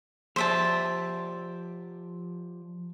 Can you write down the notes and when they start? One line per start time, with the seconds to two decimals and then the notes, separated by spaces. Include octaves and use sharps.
0.36 F3 G4 C5 D5 E5 A5